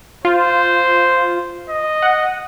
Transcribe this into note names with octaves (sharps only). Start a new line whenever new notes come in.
F4 C5
D#5
F#5